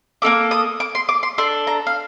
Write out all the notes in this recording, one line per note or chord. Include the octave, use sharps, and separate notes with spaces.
A#3 D#4 A4 D6
D#6
D6
C6
D6
C6
D4 A4 C6
A#5
F5